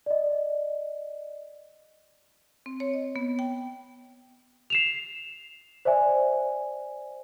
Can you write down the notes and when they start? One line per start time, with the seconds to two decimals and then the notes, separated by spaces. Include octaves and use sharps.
0.06 D5 D#5
2.66 C4
2.80 C#5
2.93 D#5
3.16 B3
3.39 G5
4.70 C7 E7 F7
5.85 C5 D5 E5 G#5